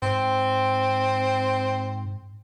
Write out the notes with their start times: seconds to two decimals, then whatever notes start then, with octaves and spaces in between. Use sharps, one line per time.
0.02 G#2 C4